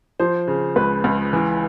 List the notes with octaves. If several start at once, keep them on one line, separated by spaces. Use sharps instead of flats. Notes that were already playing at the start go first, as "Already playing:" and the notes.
F3 C5
C#3
C#2 B4
C#2
E3